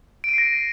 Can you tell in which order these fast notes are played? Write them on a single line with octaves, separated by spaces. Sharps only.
D7 D#7 C7 A#6